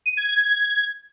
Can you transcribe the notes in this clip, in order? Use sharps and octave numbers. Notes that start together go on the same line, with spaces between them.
D#7
G#6
G#6
G#6